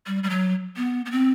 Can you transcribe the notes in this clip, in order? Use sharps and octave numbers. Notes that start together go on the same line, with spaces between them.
G3
G3
F#3
B3
B3
C4